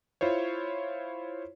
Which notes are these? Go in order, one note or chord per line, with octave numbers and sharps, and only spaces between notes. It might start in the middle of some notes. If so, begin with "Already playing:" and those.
E4 F4 C5 C#5